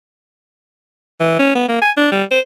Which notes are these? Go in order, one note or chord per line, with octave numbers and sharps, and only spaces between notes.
E3
C#4
B3
A#3
G#5
D4
G3
C5